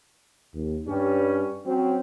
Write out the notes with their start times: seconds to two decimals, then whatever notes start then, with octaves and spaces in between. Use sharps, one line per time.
0.54 D#2
0.87 G2 G3 C#4
1.66 F#3 C4 C#4